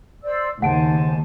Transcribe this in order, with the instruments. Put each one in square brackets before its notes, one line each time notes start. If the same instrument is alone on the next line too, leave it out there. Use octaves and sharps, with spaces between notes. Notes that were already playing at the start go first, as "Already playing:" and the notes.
[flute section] C5 D5 E6
[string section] D#2 [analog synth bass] C#3 [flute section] C5 G#5 A5 [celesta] F#5 D7